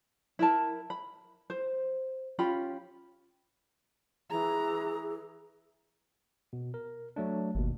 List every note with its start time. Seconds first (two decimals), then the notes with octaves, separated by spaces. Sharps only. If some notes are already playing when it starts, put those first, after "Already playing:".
0.39 E4 A#4 A5
0.90 B5
1.50 C5
2.39 C#4 F4 G4 B5
4.31 E3 G#4 A#5
6.53 B2
6.74 A#4
7.16 F#3 A3 D4
7.55 G1 D#2 B2